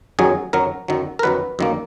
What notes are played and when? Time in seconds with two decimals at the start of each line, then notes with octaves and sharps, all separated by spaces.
0.19 F#2 D#3 F#3 G#4
0.53 F#2 D#3 F#3 A#4
0.88 F#2 D#3 F#3
1.19 A#4
1.23 F#2 D#3 F#3 B4
1.59 F#2 D#3 A#3